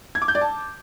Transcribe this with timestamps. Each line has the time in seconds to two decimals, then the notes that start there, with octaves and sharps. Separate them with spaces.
0.15 G#6
0.22 D6
0.28 G6
0.35 D5
0.41 A5